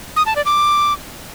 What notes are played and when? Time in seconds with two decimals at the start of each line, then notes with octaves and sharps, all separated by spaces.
0.16 D#6
0.26 A5
0.36 D5
0.46 D6